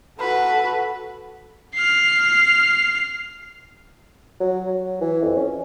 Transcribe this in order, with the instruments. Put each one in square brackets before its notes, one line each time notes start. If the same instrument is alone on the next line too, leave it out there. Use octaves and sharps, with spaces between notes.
[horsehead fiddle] F#4 A4 [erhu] B4
[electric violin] F6 C7
[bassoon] F#3
F#3
E3
F2
C#4